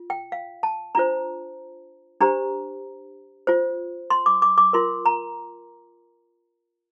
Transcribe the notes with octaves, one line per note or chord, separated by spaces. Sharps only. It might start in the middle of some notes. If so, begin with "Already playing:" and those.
Already playing: F4
G5
F5
A5
D4 F4 C5 A#5
D4 G4 C5 A#5
F4 C5
C6
D6
D6
D6
F4 A#4 C6
A#5